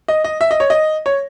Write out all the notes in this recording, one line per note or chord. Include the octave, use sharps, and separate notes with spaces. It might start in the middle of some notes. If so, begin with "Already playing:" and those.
D#5
D#5
E5
D#5
C#5
D#5
C#5